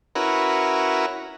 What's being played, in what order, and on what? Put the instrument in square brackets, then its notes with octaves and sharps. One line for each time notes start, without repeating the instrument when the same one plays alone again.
[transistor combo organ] C#4 E4 F#4 A#4 B4